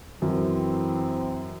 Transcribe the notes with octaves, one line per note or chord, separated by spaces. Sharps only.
F#2 E3 C4